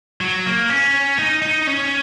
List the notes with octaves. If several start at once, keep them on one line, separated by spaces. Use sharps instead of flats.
F#3
A#3
C#4
D#4
D#4
C#4